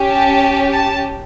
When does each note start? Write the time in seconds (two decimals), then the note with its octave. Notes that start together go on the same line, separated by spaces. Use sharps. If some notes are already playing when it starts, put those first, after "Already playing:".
Already playing: C#4 G4
0.11 A5
0.72 A5